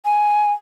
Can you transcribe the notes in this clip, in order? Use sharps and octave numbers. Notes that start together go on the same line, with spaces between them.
G#5